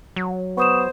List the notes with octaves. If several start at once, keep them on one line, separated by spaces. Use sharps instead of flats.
F#3
B3 C5 C#6 D#6 E7